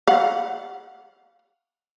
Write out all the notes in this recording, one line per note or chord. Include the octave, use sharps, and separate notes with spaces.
F5 F#5